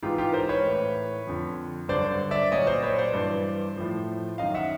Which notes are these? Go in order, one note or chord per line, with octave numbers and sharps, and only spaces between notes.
G#2 E3 F4 G4
F4 G4
A#4 C5
B4 C#5
A2 E3
F2 D3 F3
G2 D3 F#3 C5 D5
D5 E5
A#2 F#3 C#5 D#5
C5 D5
B4 C#5
C5 D5
G2 E3
A2 F3
F#2 D#3 F#3 D#5 F5
E5 F#5